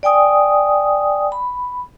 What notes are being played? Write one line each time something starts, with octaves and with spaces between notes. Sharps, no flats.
D5 G5 G#5 D#6
B5